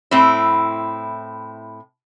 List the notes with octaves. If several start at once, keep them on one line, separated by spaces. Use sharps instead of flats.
A2 C4 E4